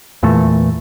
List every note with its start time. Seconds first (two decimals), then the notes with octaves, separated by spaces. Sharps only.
0.23 E2 A#2 E3 A3